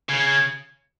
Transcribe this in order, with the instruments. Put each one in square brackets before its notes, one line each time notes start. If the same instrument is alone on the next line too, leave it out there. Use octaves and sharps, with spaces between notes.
[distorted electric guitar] C#3 [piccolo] G#6
[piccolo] G#6